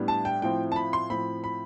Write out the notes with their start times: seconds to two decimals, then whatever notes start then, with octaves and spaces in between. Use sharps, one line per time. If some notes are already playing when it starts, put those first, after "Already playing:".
Already playing: A2 G3 B3 D4
0.08 A5
0.25 G5
0.42 A2 F3 C4 E4 G5
0.72 A5
0.76 B5
0.93 C6
1.10 A2 F3 C4 B5
1.44 B5